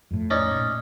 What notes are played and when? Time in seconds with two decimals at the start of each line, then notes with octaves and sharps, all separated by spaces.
0.11 F2 A2
0.30 C#4 D#4 D5
0.55 A#2